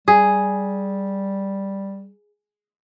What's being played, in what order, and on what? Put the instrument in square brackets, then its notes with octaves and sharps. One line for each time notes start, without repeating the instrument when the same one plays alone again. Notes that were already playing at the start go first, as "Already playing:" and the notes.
[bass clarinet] G3 [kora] G#4